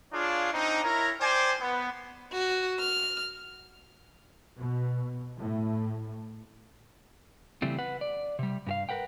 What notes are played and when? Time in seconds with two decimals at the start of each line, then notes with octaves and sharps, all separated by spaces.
0.12 D4 F4 G#4 C#5 F5
0.53 C4 D4 D#4
0.84 E4 A#4 C#5 A#5
1.20 C5 D5 G5 G#5
1.60 B3
2.32 F#4
2.79 F6
4.57 B2
5.38 A2
7.62 C#3 E3 G3 A3 C4
7.78 B4 F#5
8.01 D5
8.39 C3 G3
8.66 G2 G4 F5
8.89 A#4 B4 F#5 G5